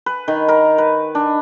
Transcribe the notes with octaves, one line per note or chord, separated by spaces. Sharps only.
B4
D#3
A#4
B4
D4